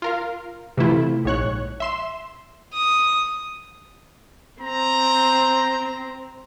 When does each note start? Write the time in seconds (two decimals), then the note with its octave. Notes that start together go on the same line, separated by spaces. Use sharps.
0.02 F4 A#4 F5
0.77 C3 E3 A3 E4 F4
1.25 A#1 G#2 C#5 C#6 F#6
1.80 E5 C6 E7
2.73 D#6
4.61 C4 A#5